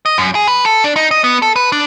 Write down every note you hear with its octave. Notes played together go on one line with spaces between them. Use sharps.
D#5
F#2
G#4
B4
A4
D4
D#4
D#5
B3
A4
B4
D4